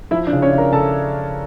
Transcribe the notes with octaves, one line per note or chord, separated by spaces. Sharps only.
F3 E4 E5
D4 D5
C#3
C#4 C#5
C#3
A#4 A#5
C#3 A4 A5